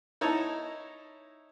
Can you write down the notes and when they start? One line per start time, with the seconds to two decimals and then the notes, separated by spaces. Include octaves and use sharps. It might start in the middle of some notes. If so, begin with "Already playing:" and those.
0.21 D#4 E4 C#5 A5 A#5